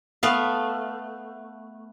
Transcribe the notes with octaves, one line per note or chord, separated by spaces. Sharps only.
A3 B3 F5